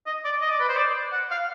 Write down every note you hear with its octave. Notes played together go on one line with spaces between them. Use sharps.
D#5
D5
D#5
D5
B4
C5
D5
F#5
F5